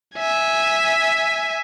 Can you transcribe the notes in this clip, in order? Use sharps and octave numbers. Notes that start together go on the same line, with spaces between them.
E5 G#5